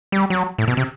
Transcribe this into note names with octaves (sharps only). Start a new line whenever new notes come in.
G3
F#3
A2
B2
C3